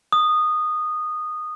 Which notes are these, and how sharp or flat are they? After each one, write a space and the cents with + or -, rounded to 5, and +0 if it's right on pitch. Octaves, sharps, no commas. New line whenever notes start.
D#6 -15